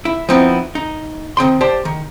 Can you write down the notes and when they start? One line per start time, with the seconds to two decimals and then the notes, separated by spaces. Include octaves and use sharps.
0.05 E4
0.29 F3 B3 C4 D#4 E4
0.75 D#4
1.37 D#3 C4 G5 C6
1.61 G4 C5 D5 A5
1.85 D#3